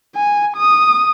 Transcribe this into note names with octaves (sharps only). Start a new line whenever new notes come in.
G#5
D#6